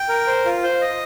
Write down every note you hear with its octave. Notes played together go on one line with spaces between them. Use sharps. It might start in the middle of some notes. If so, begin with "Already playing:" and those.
Already playing: G5
A#4
C5
F4
C5
D#5